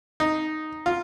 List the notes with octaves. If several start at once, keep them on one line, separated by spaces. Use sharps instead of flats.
D#4
F4